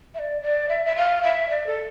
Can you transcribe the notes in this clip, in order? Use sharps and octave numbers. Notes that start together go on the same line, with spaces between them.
E5
D5
D5
E5
E5
F5
E5
D5
A4